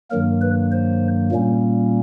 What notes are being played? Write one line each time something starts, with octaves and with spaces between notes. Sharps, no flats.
G2 D#3 F#3 A#3 A#4
B4
C5
A#2 G3 A#3 C#4